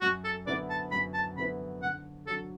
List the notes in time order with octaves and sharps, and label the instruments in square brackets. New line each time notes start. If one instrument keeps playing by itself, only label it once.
[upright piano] F#2 [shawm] F#4
[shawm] A4
[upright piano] D3 B3 E4 B4 [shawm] D5
[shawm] A5
[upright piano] F#2 [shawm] B5
[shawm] A5
[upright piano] D3 B3 E4 B4 [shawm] B5
[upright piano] D3 [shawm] F#5
[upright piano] F#3 D4 [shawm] A4